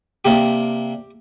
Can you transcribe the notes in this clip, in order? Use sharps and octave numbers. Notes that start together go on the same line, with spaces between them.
C3 A#3 D4 G4